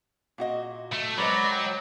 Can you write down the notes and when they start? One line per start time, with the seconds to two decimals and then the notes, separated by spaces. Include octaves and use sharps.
0.38 A#2 F#4 D#5
0.93 A3
1.18 F#3 G#3 B4 C5 D5 A#5 B5
1.51 G5